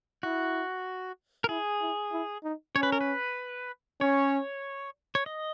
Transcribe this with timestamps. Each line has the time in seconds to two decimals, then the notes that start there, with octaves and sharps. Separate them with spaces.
0.23 E4 F#4
1.44 A#4
1.49 E4 G#4
1.81 E4
2.12 E4
2.44 D#4
2.75 C#4 C#5
2.83 B4
2.92 A#4
3.01 B4
4.00 C#4 C#5
5.15 C#5
5.26 D#5